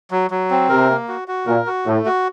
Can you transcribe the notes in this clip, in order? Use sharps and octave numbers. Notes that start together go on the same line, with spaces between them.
F#3
F#3
C4
C3 A#4
A#3
F#4
F#4
A#2 A#4
F#4
A2 A3
F#4